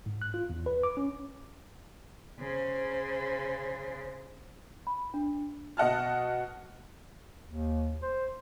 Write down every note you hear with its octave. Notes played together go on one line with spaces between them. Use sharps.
G#2
F#6
F4
E2
B4
D6
C#4
C#3 C5
B5
D4
B2 D#5 F#5 A5 F6
D#2
C5